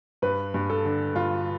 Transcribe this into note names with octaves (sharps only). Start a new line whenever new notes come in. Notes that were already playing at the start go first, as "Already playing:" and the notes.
G2 B4
G2
A4
D3
G2 F4